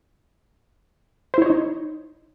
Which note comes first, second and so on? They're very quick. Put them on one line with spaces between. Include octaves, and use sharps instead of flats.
C5 E4 C#5 D#5 D#4